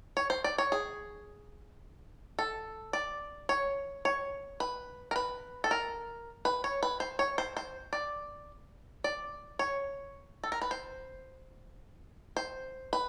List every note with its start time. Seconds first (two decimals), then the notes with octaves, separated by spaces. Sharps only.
0.17 C#5
0.30 C5
0.44 D5
0.58 C#5
0.72 G#4
2.39 A4
2.93 D5
3.49 C#5
4.05 C#5
4.60 B4
5.11 A#4
5.16 B4
5.64 A4
5.71 A#4
6.45 B4
6.64 C#5
6.83 B4
7.00 C5
7.19 C#5
7.38 C5
7.57 C5
7.93 D5
9.04 D5
9.59 C#5
10.43 A4
10.52 A#4
10.61 B4
10.71 C5
12.37 C5
12.93 B4